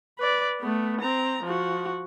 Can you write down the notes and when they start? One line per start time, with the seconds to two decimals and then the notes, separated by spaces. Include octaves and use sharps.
0.19 B4 D5
0.60 A3 B3
1.01 C4 A#5
1.44 F3 F#4